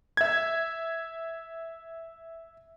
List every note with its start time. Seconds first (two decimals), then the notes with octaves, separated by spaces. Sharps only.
0.17 E5 G#6